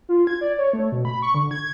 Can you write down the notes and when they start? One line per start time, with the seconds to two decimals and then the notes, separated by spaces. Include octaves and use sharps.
0.09 F4
0.27 G#6
0.41 D5
0.58 C#5
0.73 A3
0.92 B2
1.05 B5
1.22 C#6
1.34 D3
1.51 G#6